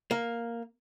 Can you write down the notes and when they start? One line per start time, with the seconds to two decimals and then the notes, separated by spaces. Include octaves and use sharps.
0.11 A#3